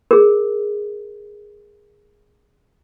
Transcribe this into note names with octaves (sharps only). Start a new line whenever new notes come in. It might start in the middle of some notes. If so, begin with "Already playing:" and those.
G#4 A#4